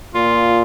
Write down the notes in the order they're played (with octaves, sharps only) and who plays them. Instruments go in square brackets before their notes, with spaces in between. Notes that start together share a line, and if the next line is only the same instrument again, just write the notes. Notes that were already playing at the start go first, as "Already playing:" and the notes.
[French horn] A#2 [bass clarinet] F4